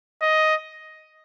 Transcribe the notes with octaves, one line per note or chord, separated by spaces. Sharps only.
D#5